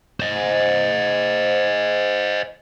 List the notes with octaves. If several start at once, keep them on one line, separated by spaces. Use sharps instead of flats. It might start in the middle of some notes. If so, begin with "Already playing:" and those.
C5 D#5